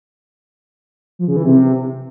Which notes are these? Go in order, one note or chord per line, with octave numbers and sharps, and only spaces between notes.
F3
C#3
E3
C3